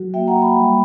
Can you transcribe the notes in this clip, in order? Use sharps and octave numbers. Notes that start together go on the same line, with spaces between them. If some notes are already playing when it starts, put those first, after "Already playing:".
Already playing: F#3 F#4
A#3 E5 G5
F#5 A#5
A#3
G5 B5
G3